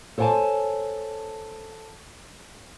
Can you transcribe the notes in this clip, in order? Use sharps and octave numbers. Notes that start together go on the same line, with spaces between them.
A4 C5 C#5 F#5 G#5 A5